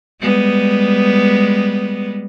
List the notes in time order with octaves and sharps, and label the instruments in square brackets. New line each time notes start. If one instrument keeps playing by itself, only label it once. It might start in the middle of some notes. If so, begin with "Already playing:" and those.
[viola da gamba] G3 G#3 B3